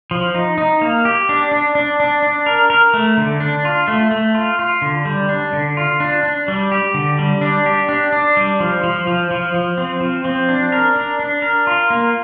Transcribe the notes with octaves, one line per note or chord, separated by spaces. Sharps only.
F3
D#4
D#4
A#3
G4
D4
D4
D4
D4
D4
A#4
A#4
A3
D3
D4
F4
A3
A3
F4
F4
D3
G3
D4
D3
F4
D4
D4
G3
G4
D3
G3
D4
G4
D4
D4
G3
F3
F3
F3
F3
F3
C4
F3
C4
D4
A#4
D4
D4
A#4
F4
A#3